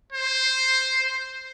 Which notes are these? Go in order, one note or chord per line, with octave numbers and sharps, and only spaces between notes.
C5